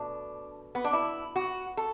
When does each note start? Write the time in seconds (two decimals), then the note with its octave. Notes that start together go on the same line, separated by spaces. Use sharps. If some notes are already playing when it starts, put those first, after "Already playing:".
Already playing: B2 A3 D4
0.75 B3
0.84 D4
0.93 E4
1.36 F#4
1.77 A4